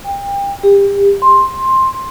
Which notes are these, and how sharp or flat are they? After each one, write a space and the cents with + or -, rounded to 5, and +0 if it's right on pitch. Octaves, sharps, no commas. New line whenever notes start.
G5 +30
G4 +30
C6 +10